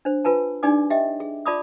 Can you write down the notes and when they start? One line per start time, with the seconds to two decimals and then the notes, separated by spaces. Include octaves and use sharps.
0.05 D4 C5
0.25 F4 B4 G#5 A5
0.63 D4 D#4 G4 D5 G#5 D6
0.90 G4 D#5 E5 G5
1.20 G#4
1.46 F4 D5 A5 B5 D6 D#6